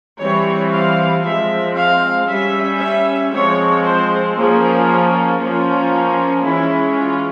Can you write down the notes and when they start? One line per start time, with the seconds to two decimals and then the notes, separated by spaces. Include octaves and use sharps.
0.20 E3 G3 C4 C#5
0.72 F5
1.24 F3 G#3 C4 E5
1.76 F5
2.29 G3 C#4 E5
2.80 E5
3.32 F3 G#3 C4 C#5
3.84 C5
4.37 F3 A#3 C#4 G#4
5.41 F3 A#3 C#4 F4
6.45 E3 G#3 C#4 E4
6.98 F4